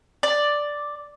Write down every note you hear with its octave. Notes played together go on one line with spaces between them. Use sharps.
D5